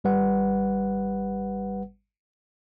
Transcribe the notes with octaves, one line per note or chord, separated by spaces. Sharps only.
G#1 G3 B4 F#5